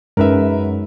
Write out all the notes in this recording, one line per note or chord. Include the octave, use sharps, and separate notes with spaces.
F#2 G#3 D#4 A#4 B4 E5